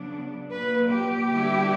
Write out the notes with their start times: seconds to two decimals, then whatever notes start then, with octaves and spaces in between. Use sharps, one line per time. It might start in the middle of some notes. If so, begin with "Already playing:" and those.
Already playing: C#3 F#3 B3 D4
0.50 A#2 F#3 A#3 B4
0.90 G4
1.30 D3 G3 B3 E4